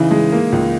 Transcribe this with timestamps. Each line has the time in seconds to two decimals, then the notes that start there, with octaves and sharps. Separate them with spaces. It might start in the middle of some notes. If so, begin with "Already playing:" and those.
Already playing: C#3 E3 D#4
0.11 G#3
0.32 A#3
0.52 C#2